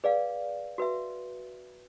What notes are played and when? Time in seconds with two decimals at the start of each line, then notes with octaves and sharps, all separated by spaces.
0.04 G#4 B4 D5 F5
0.78 F#4 B4 E5